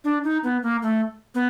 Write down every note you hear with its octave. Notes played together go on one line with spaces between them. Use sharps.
D4
D#4
B3
A#3
A3
B3